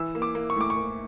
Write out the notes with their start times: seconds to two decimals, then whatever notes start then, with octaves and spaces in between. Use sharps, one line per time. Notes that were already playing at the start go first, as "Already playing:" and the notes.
Already playing: E3 E6
0.15 A#3
0.22 D6
0.35 A#3
0.50 C#6
0.56 A2 D6
0.70 C#6
0.77 A#3